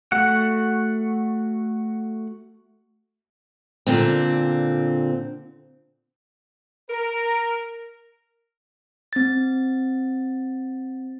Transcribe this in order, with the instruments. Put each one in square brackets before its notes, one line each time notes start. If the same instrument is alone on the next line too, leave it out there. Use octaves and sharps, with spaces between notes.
[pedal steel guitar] A3 F#4 F#5
[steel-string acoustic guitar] A#2 D3 C4
[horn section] A#4
[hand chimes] C4 A6